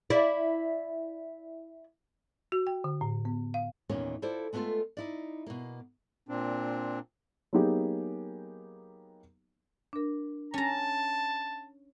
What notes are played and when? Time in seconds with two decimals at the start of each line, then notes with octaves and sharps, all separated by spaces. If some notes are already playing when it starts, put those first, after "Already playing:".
0.10 E4 D5
2.52 F#4
2.67 G5
2.84 D3
3.01 A2
3.25 B3
3.54 F5
3.89 E2 A#2 D#3 A#3 C#4 C#5
4.22 E4 F4 A4 C5 D5
4.53 G#3 A3 B3 D4 F4 A4
4.97 D#4 E4 D5
5.46 B2 A#3
6.29 A#2 C4 D4
7.53 F#3 A#3 B3 D#4 G4 G#4
9.93 D4 A#4
10.54 C#4 A5 A#5